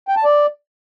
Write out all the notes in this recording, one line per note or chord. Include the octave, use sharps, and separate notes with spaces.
G5
A5
D5